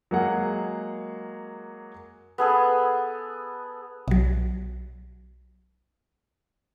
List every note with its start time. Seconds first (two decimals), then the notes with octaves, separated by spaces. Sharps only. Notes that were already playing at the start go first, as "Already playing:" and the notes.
0.11 F#3 G#3 A#3 G#4 F#5
2.38 B3 G#4 A4
4.08 B1 F#3